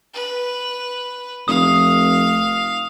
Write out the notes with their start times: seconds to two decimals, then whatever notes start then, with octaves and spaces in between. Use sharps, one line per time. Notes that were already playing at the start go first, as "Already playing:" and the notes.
0.14 B4
1.48 F1 F5 D#6